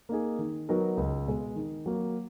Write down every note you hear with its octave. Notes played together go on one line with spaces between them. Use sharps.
A#3 D#4 G#4
D#3
F#3 B3 D#4 A#4
C#2
B2 G#3
D#3
F#3 A#3